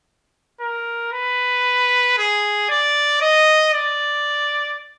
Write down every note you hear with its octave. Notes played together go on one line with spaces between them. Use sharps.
A#4
B4
G#4
D5
D#5
D5